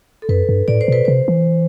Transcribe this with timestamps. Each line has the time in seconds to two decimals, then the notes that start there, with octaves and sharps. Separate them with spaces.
0.22 A4
0.29 F#2 B4
0.49 G2
0.68 A2 D5
0.81 C5
0.88 B2 B4
1.05 C3 C5
1.28 E3